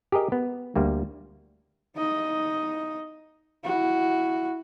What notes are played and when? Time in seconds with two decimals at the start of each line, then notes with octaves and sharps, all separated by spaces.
0.12 G4 G#4 A#4 D#5
0.32 B3
0.75 D2 G3 A#3
1.95 D#4 D#5
3.64 E4 F#4